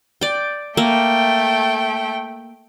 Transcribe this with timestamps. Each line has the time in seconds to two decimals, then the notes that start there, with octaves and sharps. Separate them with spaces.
0.21 D5 G5
0.77 A3 A#3 G5